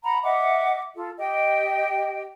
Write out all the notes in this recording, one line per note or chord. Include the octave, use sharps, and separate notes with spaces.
F#5 A#5 B5
D#5 E5 F#5 D6
F4 A4
G4 D#5 G5